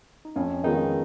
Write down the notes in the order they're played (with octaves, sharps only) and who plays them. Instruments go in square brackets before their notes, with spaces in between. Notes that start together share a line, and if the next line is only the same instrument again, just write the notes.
[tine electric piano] D#4
[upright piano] F2 [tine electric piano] C#4
[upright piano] D#3 G#3 B3 F4 [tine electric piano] D#4